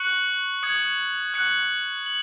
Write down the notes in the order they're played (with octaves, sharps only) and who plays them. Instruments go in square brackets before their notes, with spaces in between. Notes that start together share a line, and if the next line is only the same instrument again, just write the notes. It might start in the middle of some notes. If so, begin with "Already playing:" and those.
Already playing: [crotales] C#6 F#6 C#7 F#7
D#6 G#6 C#7 F#7
F#6 C#7 F#7
F#7